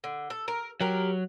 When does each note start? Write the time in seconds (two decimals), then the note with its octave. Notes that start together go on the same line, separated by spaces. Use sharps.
0.04 D3
0.30 A4
0.48 A#4
0.81 F#3 G4 A#4